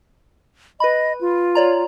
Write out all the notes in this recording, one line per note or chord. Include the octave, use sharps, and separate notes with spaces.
B4 D#5 B5
F4
C#5 D5 A#5